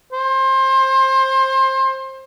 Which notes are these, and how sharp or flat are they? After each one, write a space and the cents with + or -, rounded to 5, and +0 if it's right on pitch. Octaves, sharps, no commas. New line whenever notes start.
C5 +25